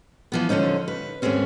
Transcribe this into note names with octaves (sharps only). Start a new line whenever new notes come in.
E3 F3 B3
D3 F3 A#3 C#4 D#4
B4
D#2 G#2 G#3 A3 C4 C#4